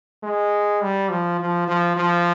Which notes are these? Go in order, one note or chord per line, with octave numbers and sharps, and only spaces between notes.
G#3
G3
F3
F3
F3
F3